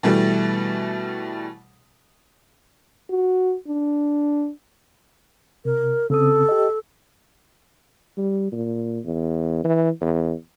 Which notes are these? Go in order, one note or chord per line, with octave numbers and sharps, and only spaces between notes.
B2 E3 G3 A3
F#4
D4
C3 A#4
C#3 C4 A4 D#6
G4 D#5
G3
A#2
E2
E3
E2